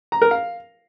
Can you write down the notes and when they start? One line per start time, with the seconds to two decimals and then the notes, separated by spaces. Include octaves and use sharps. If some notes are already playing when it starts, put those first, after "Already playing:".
0.12 A#5
0.22 A#4
0.31 F5